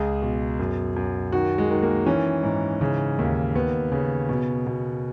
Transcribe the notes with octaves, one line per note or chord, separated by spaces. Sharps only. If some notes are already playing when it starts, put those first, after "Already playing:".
Already playing: C#2 G#4
B2
F#2
F#2
D#3 F#4
G#3
D#3
A#3
E3 C#4
G#2
C#3
D#2
D#2 B3
C#3
B2
B2